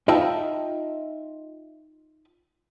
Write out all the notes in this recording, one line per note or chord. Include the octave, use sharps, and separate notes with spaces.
D#4 F4 D#5 E5 G5 A5